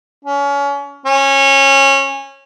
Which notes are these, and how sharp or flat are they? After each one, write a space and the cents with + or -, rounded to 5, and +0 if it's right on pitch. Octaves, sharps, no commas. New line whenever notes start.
C#4 +30
C#4 -20